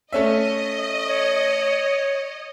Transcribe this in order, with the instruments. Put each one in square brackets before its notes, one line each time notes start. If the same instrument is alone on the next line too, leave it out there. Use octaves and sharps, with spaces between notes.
[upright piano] A3 C#4 E5 [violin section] D#5
[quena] C#5